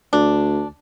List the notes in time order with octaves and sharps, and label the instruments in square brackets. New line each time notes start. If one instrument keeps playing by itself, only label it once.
[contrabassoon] D2 [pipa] D4